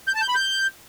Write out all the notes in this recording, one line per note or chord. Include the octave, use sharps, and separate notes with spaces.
G6
A5
G6
B5
G6